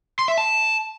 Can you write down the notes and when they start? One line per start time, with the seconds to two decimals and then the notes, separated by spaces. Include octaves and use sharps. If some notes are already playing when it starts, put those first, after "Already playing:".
0.19 C6
0.28 E5
0.38 A5